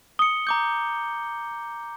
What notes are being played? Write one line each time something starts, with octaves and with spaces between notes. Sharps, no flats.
D#6 C#7 G7
A#5 D6 G6